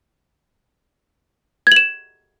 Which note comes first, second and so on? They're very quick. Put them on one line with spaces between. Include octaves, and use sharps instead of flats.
G#6 F#7 E7